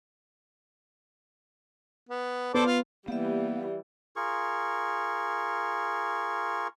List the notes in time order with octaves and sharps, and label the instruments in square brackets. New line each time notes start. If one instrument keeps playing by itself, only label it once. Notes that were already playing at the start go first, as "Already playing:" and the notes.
[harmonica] B3
[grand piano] B3 [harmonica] A4 C5 D5
[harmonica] F4
[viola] E3 G3 [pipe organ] A#3 [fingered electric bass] B3 [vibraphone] G4 D5 E5
[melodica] F4 G#4 A#4 C#6